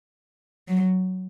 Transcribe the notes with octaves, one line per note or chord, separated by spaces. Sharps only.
F#3